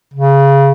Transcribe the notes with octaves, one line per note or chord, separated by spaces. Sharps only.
C#3